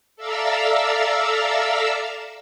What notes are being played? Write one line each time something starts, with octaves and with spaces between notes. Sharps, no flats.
A4 D5 E5 F5 A#5 E6